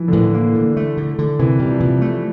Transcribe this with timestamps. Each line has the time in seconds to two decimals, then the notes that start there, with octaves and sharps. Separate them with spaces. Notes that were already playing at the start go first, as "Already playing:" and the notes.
Already playing: E3 F3
0.08 D3
0.13 A2 E3
0.34 A#3
0.55 D3
0.77 A3
0.97 D3
1.19 D3
1.39 C3 E3
1.59 C3 G3
1.70 F3
1.80 C3 E3
2.02 A3